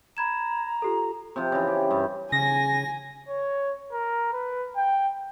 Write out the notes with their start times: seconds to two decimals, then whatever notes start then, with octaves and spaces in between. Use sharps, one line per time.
0.17 A#5 B5 G#6 E7
0.82 F4 G4 A4
1.36 C3 F3
1.52 C#3 E3
1.67 G4
1.91 G2
2.32 C#3 G#5 A#6
3.29 C#5
3.92 A#4
4.33 B4
4.76 G5